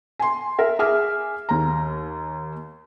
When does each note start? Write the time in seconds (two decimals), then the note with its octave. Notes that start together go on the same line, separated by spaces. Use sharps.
0.19 G#5 C6
0.58 A#4 E5
0.79 G#4 E5 G#5 D6 F6
1.49 D#2 A#5